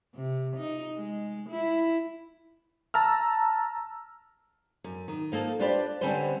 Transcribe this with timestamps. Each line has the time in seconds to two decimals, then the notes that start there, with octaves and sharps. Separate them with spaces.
0.15 C3
0.57 D#4
0.97 G#3
1.50 E4
2.94 A5 A#5 E6 F6
4.84 F#2
5.08 D#3
5.32 F3 A#3 D#4 A4
5.60 D4 F4 G4 B4 C5 D5
6.01 D3 G3 C4 C#4 B4 C5